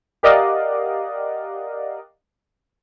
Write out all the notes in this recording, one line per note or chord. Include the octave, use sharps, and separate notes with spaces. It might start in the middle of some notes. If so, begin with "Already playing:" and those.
G4 A#4 D5 D#5 F5 F#5